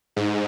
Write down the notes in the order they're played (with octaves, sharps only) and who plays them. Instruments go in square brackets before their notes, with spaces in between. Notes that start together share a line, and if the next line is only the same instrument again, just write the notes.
[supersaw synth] G#2